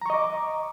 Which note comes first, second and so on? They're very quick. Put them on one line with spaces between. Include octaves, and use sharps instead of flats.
A#5 C#6 D#5 D6